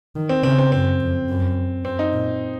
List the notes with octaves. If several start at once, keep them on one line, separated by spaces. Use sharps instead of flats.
D#3
C4
C#3 C4
C4
F#2 C4
F2
F#2
F#2 C4
D#4
A#2